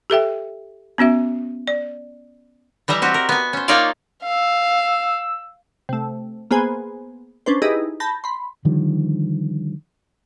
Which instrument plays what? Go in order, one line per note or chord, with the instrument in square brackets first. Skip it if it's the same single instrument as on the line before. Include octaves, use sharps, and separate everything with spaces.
[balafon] G4 A4 E5 G5
B3 C#4 F#4 E5
D5
[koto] E3 G3 D#5 E5 A#5
C4 F#4 G4
A#4
B3 G#5
C#4 C5
A#3 D#4 F4 C#5 D5 F5
[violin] F5 [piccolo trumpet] E6
[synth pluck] C3 A3
A#3 B3 G#4 C5 G#5
C#4 D4 B4 C5
D#4 E4 G4 G#4 B4 D#5
A5 B5 G6 A#6
B5 C6
[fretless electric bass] D3 D#3 F3 G3